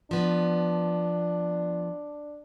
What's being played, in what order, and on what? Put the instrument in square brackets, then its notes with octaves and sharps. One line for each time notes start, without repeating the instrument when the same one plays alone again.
[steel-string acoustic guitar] F3 B3 [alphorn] D4